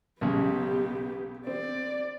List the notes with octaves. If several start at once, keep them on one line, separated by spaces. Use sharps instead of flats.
B1 C#3 B3 G4
C4 D5